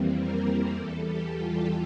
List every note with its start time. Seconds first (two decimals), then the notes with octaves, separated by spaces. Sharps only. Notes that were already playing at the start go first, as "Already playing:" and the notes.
Already playing: F2 E3 G3 A#3 C4
0.20 A#4
0.78 E2 E3 G3 A4
1.07 G4
1.36 F4